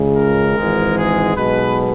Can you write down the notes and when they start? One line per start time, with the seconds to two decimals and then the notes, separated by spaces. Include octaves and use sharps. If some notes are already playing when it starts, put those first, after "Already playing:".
Already playing: C#2 C#3 G#3
0.15 A#4
0.55 G#1 G#2 E3 G#3
0.96 G#4
1.35 B1 B2 G#3 B4